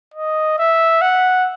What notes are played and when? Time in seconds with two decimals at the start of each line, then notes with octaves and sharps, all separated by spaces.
0.14 D#5
0.58 E5
1.01 F#5